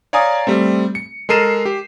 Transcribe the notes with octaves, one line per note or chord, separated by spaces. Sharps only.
C#5 D5 F5 G#5 A#5 D#6
G3 A3 C4
C#7
G#3 A4 A#4 C7 D#7 E7
G4